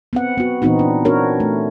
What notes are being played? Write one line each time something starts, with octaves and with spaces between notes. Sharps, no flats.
B3 C4 F#5
B3 F#4
A#2 E3 B3 C4 D#4 F#4
D4
C4 D4 F#4 A#4 C#5
A3